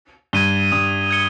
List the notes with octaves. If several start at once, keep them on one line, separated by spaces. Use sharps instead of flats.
G2 G#6 D#7 G7
G2 D#6
G#6 C#7 G7